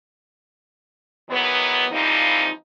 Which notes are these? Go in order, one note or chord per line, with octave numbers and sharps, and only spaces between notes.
D#3 E3 F#3 G#3 B3
E3 F3 G3 A#3 C4 D#4